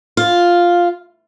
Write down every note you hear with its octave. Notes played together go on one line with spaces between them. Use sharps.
F4